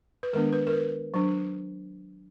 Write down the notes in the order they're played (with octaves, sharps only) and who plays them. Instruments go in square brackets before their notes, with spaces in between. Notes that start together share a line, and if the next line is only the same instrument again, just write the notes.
[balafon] B4
D#3 G#3 B3 D4 A#4
B4
A#4
B4
F#3 D4